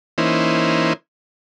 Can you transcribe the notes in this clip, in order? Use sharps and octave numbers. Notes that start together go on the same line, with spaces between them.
E3 A#3 C#4 D#4 E4 C5